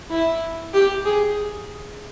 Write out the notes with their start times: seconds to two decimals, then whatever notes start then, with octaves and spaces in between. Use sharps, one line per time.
0.10 E4
0.74 G4
1.05 G#4